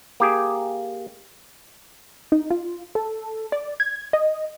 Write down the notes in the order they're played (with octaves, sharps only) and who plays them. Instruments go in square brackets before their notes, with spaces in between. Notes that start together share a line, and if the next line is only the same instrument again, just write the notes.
[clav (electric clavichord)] A#3 G4 G#4
[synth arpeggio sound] D#4
F4
A4
D5
G#6
D#5